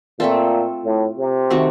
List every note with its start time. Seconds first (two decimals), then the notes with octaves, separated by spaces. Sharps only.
0.20 A#2 A3 C4 F4 A4
0.85 A2
1.18 C3
1.50 D#3 A3 C4 F#4